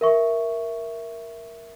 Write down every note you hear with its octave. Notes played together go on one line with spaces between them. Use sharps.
A#4 E5 C#6